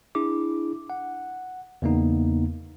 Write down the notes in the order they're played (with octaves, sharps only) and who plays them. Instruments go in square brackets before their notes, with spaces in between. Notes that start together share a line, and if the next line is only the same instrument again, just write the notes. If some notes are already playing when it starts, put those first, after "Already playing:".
[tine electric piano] D4 E4 G#4 D6
F#5
E2 C#3 A#3 B3 D#4